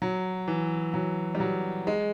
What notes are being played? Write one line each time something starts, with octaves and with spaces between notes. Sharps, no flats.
F#3
E3
F#3
G3
F#3
G#3